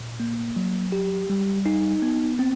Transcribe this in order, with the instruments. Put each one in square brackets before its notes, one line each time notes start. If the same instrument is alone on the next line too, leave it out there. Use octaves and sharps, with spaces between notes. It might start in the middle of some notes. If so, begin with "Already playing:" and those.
Already playing: [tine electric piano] A#2
A#3
F#3
G4
G3
D#4
B3
C4